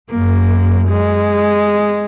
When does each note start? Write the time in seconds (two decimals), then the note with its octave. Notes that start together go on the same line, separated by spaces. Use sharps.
0.11 F#2 A#3
0.89 G#3